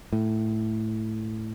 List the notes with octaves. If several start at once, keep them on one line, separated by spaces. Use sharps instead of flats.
A2